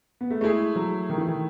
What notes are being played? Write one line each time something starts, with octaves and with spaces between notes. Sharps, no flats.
B3
A3
G#3 A3 E4 G#4
F#3
D#3
E3
D#3